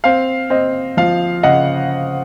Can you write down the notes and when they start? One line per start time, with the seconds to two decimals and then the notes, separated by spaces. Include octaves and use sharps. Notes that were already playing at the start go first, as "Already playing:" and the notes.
0.04 C4 F5
0.50 C4 D#5
0.97 F3 F5
1.43 C#3 D#5 F#5